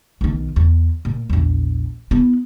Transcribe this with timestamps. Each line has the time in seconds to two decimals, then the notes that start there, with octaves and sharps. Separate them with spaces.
0.21 B1 D#3
0.56 E2
1.05 A#2
1.30 A#1 E2
2.11 B3 E4